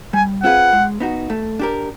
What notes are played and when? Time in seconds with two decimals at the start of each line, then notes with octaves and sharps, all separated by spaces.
0.13 G3 G#5
0.43 C4 F4 G#4 B4 F#5
0.73 G#3
1.00 B3 D#4 F#4
1.30 A3
1.59 D4 G4 A#4